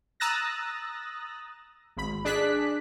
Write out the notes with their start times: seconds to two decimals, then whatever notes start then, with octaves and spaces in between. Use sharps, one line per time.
0.20 A#5 D#6 E6 F#6 A6 A#6
1.97 G#1 B5
2.25 D4 G#4 F#6 B6